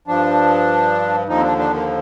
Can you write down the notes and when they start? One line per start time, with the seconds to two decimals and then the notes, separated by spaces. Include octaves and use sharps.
0.07 G2 F3 D4
1.28 D#2 D3 F3 D#4
1.37 C4
1.43 D4
1.58 D4
1.74 A#3